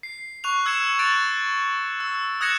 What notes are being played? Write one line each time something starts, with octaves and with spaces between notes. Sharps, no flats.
C7
C#6 F#6 F7
E6 G#6 C#7 E7
F#6 A6 D7 F7
E6
D#6 F#6 G#6 A#6 C#7 E7